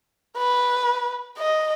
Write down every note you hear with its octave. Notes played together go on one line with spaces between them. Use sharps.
B4
D#5